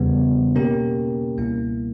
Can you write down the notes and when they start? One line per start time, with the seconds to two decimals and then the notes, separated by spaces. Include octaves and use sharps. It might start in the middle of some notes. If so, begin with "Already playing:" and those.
Already playing: E2 C#3 G3 B3
0.56 B2 A#3 C#4 G4 A#4
1.37 C#2 B2 G3 A#3 E4